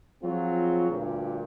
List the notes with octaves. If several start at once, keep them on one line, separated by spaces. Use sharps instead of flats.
F3 F#3 C4 F4 G#4
D2 G2 A#2